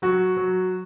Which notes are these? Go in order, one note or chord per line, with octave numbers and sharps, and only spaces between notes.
F#3 F#4
F#3